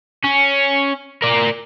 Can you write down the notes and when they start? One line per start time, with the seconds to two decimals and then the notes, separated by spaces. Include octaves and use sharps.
0.24 C#4
1.22 A#4 D5